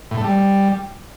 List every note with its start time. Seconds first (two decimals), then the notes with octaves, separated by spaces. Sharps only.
0.11 A2
0.17 A3
0.24 G3